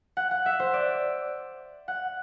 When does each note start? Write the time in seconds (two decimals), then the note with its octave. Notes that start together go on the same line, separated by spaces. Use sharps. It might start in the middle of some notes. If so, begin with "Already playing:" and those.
0.17 F#5
0.31 F#5
0.46 E5
0.60 C5
0.73 D5
1.88 F#5